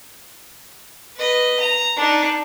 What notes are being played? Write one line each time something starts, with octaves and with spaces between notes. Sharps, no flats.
B4 D#5
A#5
D4 D#4